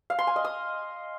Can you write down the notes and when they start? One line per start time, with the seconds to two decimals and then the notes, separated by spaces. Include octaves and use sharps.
0.10 F5
0.19 C6
0.27 G#5
0.36 D#5
0.44 D#6